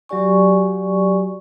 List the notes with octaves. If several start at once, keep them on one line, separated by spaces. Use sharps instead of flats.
F#3 F#4 G4 D5 G#5 C#6